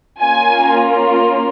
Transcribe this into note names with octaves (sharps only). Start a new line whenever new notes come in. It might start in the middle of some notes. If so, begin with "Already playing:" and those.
A#3 C#4 F4 G#5